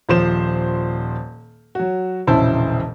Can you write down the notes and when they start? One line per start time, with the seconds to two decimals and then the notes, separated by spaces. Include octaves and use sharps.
0.09 D#1 F3 C5 E7
1.75 F#3 F#4
2.27 E1 A#1 C#3 E4 C5 A5